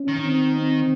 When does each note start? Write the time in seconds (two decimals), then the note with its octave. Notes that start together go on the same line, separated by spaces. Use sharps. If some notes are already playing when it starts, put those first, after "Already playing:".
Already playing: C#4
0.09 D#3
0.24 C4
0.56 C4